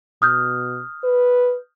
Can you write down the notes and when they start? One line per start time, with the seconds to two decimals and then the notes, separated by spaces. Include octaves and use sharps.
0.22 B2 D#6 F6 G6
1.04 B4